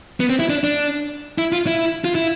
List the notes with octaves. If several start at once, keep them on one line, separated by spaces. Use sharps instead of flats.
B3
C4
E4
D4
D4
E4
F4
E4
F4
E4